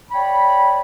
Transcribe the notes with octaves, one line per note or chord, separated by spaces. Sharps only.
C#5 D5 G5 B5